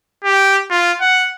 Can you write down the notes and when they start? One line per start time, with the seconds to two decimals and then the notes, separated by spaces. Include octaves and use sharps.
0.25 G4
0.71 F4
1.01 F#5